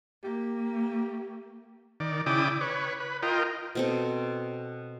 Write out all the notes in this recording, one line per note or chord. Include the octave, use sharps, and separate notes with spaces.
A#3 G4
D#3 D5
C#3 E4 D5 G5 D6 D#6
B4 C#5
B4
F4 A#4 D#5 G5
B2 C4 A4